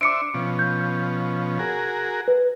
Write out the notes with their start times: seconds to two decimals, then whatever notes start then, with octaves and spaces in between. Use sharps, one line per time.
0.01 D4 C5 E5 D6 C#7 D7
0.34 B2 F3 C#4
0.59 G6
1.59 F#4 G#4 A#4
2.28 B4